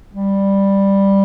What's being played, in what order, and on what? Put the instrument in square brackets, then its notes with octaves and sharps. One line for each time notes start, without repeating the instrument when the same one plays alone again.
[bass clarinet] G3